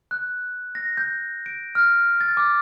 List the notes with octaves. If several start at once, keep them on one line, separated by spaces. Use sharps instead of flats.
F#6
A#6
G6
D7
F6
A6
D6